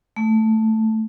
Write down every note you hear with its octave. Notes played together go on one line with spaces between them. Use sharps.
A3